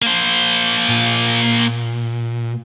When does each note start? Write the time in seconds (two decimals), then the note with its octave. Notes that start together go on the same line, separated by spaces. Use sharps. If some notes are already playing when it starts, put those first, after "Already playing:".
0.02 A#3 C5
0.89 A#2